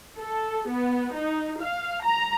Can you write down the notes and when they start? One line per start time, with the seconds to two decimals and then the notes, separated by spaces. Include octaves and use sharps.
0.18 A4
0.69 B3
1.17 D#4
1.60 F5
2.04 A#5